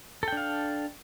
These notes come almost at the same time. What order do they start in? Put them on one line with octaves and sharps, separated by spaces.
A4 G5 D4 F5